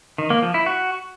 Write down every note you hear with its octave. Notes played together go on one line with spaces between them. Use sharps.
D#3
A#3
F3
E4
F#4